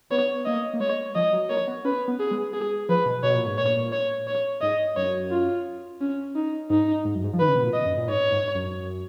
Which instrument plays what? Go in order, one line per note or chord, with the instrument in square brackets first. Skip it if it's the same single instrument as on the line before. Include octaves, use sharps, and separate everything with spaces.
[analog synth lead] B3 [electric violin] C#5
[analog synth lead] A#3 [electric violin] D#5
[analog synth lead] A#3
[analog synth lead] G#3 [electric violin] C#5
[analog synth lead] F3 [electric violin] D#5
[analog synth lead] F#3
[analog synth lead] A#3 [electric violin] C#5
[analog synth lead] B3
[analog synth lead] C#4 [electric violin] B4
[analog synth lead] B3
[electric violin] G#4
[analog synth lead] G#3
[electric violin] G#4
[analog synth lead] F3 [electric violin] B4
[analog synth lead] B2
[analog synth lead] B2 [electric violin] C#5
[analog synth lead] A#2
G#2
[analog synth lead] A#2 [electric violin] C#5
[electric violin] C#5
C#5
[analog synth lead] G#2 [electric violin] D#5
[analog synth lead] F#2 [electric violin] C#5
[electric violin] F4
C#4
D#4
[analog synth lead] G#2 [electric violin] D#4
[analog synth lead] G#2
F#2
G#2
F3
[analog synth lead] D#3 [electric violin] B4
[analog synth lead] C#3
B2
A#2
[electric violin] D#5
[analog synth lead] F#2
A#2
[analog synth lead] G#2 [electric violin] C#5
[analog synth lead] G#2
F#2